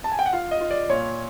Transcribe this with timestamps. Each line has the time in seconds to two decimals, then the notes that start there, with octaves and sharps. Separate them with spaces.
0.04 A5
0.12 G#5
0.19 G5
0.26 F#5
0.33 F4 F5
0.51 D#5
0.61 F4
0.71 D5
0.89 A#2 C#5